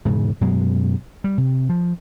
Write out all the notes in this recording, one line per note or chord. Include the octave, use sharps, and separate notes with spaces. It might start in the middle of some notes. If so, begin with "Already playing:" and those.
E1 G#2 C#3
F#2 B2 F#3 G#3
G3
C3
F3